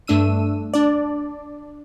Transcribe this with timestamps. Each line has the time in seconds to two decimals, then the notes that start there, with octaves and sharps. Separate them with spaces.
0.07 G2 A3 D4 E6 D#7
0.74 D4 D5